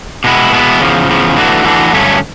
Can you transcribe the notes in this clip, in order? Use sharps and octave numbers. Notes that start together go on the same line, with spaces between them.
B2 G#3 B3 E4
B2 G#3 B3 E4
E2 C#3 F3
E2 C#3 F3
E3 A3 D4 F#4
E3 A3 D4 F#4
G2 D3 F#3 A3 C#4